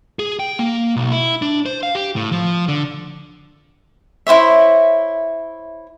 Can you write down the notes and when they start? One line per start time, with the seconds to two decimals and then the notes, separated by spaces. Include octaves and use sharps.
0.19 G#4
0.40 G5
0.59 A#3
0.97 B1
1.11 E4
1.42 D4
1.66 C5
1.83 F5
1.95 G4
2.16 A2
2.32 F3
2.68 D3
4.27 E4 C5 C#5 E5